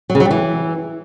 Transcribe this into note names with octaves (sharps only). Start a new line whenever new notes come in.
F#3
C#3
F#3
G3
E3